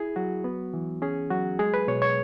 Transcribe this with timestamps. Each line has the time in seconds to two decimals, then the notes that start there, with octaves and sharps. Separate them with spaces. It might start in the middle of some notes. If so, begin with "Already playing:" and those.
Already playing: E4 G#4
0.16 F#3 F#4
0.44 B3
0.74 E3
1.02 C#4 G#4
1.31 F#3 F#4
1.59 G#3 G#4
1.74 B4
1.88 B2 C#5
2.02 C#5